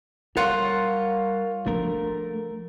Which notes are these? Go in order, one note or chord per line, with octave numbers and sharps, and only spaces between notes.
G3 F4 A#4 C#5 F#5
F3 A3 D4 A#4